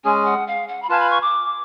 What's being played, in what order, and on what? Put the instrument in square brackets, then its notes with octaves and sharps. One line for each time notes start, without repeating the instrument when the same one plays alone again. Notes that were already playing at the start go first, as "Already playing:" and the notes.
[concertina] G#3 C#4 G#4 [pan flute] G#5
[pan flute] F#5
F5
F#5
B5
[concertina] F4 B4 F5 G#5 [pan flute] A5
[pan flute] B5
C#6
D6